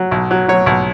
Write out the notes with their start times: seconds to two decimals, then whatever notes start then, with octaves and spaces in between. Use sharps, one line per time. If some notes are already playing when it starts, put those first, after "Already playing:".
Already playing: F#3
0.11 B1
0.31 F#3
0.48 F#3 C#5
0.66 B1